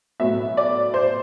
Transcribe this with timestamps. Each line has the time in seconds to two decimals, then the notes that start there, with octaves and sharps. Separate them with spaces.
0.20 B1 A2 F#3 B3 E5
0.57 D5
0.94 C5